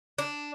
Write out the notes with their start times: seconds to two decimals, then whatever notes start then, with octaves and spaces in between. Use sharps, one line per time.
0.18 D4